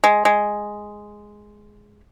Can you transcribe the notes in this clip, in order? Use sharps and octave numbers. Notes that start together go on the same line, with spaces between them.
G#3
G#3